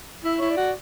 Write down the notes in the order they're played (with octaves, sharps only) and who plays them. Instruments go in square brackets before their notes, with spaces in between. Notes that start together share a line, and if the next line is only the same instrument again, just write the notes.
[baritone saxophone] E4 [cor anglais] E5
[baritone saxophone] E4 [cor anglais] C#5
[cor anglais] D5
[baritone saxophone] F#4